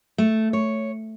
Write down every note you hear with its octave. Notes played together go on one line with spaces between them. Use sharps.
A3
C#5